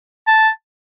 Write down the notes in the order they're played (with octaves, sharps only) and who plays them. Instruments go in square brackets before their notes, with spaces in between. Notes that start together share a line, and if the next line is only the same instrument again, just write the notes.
[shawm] A5